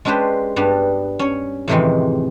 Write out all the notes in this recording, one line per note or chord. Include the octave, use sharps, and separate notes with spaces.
G#3 C#4 D4 G4 B4 C5
G2 G3 B3 D4
C#4 C#5
F2 A2 C3 D#3 E3 G#3